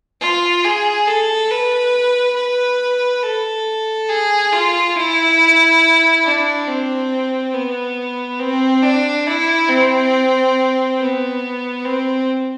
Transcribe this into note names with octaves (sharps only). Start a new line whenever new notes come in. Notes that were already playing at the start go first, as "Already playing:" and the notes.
F4
G#4
A4
B4
B4
A4
G#4
F4
E4
D4
C4
B3
C4
D4
E4
C4
B3
C4